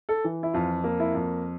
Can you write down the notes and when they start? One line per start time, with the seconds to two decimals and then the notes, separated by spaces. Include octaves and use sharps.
0.09 A4
0.24 E3
0.43 E4
0.53 F2 F4
0.84 A#3
1.00 E4
1.15 F2